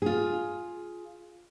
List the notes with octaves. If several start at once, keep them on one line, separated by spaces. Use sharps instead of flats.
F4 G#4